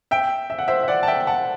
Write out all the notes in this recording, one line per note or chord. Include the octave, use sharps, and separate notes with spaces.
E5 G5
E5
F#5
C5 E5
E5
D5 F#5
A5
E5 G5
F#5 A5